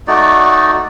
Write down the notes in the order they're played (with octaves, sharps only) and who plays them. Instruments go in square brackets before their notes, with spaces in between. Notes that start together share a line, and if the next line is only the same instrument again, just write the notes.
[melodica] A3 D#4 F#4 D5